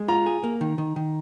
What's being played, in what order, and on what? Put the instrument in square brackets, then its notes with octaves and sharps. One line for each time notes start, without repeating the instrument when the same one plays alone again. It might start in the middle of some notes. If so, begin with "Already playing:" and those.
Already playing: [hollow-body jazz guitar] G#3
[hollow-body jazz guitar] F4 [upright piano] A#5
[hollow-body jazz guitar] G#4
A#3
D#3
D#3
D#3